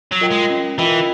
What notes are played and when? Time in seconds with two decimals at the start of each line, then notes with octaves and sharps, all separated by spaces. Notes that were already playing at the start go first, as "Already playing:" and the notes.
0.11 F#3
0.21 F4 A#4 D#5 G5
0.31 G#3
0.50 C#4
0.78 E3 F4 A#4 D#5 G5